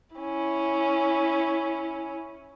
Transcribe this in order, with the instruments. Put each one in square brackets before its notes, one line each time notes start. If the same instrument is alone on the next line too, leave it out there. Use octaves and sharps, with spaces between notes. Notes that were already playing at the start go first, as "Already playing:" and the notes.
[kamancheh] C#4 E4